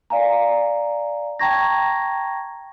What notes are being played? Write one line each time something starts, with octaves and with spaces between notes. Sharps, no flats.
D5 F5 G#5 A#5
G5 A5 A#5 C#6 G#6 A#6